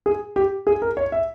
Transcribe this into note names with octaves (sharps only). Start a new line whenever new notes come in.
G#4
G4
G#4
A#4
C#5
E5